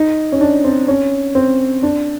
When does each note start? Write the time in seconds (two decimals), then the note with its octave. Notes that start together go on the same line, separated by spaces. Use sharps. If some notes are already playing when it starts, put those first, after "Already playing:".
Already playing: D#4
0.32 C#4
0.41 D4
0.64 C4
0.88 C#4
1.35 C4
1.83 D4